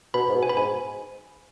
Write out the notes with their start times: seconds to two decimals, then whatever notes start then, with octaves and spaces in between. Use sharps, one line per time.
0.14 B2 B5
0.29 G#2
0.35 B2
0.43 G#5
0.49 B5
0.56 G#2 G#5